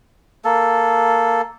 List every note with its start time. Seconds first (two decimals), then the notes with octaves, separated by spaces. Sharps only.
0.45 A#3 A4